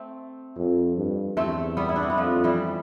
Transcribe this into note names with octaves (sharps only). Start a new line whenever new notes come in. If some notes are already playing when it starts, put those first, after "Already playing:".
Already playing: A3 C4
F2
G2
E2 A3 C4
G3 B3
E4
D4
C4
B3
F2 F3 A3
E3 G3